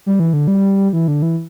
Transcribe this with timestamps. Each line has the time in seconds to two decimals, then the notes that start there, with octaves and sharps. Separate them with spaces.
0.06 G3
0.20 E3
0.33 D3
0.48 G3
0.93 E3
1.08 D3
1.22 E3